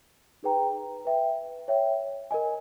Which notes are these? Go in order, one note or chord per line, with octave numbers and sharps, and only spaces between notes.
D#4 G#4 B4 G5 A#5
B4 E5 G5
C#5 E5 G5
A#4 D#5 G#5